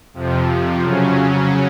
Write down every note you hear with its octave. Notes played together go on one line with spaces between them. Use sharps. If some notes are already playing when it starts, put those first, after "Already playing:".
F2 C3 F3
C#3 F#3 C#4